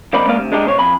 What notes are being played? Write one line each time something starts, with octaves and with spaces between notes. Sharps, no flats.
F2 A#3 C4 D#4 D5 B5
G#3 A#3 B3 D5 F5
D2 C3
G#3 D4 D#4 G4
B2 C5 C#5
F2 G#5 B5